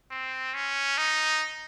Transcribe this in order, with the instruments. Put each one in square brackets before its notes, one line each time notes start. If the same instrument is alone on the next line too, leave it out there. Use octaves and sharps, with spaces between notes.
[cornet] C4
C#4
D#4